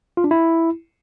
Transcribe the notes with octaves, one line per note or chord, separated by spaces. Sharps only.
F4
D4
E4